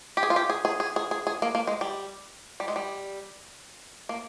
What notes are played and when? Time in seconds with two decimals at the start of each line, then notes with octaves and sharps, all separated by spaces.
0.17 G4
0.23 G#4
0.30 F4
0.36 G4
0.50 G#4
0.65 G#4
0.80 G#4
0.96 G#4
1.11 G#4
1.27 G#4
1.42 A#3
1.55 A#3
1.67 G#3
1.81 G3
2.60 G3
2.68 G#3
2.76 G3
4.09 A#3